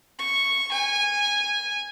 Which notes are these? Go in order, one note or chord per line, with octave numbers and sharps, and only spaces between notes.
C#6
G#5